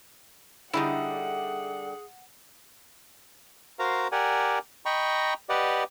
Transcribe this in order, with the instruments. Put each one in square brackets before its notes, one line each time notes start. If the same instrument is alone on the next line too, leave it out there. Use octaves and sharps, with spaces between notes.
[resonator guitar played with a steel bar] D3 G3 [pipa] D#4 E4 [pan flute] G#4 [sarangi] F#5
[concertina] F#4 A#4 C5 F5 A#5
G4 A#4 D5 F#5 G#5
D#5 G5 A#5 B5 C#6
G4 B4 D5 D#5 F#5